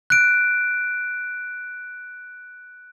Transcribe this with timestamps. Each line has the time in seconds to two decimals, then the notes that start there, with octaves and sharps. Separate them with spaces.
0.10 F#6 D7